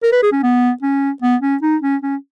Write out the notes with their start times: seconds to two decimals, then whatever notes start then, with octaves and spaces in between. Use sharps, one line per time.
0.03 A#4
0.12 B4
0.23 G#4
0.32 C#4
0.43 B3
0.82 C#4
1.22 B3
1.42 C#4
1.62 D#4
1.82 C#4
2.02 C#4